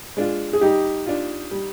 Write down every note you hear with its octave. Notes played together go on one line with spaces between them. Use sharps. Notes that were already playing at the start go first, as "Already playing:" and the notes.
G#3 D4 F4
G#4
G3 D#4 G4
D4 F4
G3